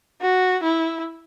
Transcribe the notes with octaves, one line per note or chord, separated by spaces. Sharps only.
F#4
E4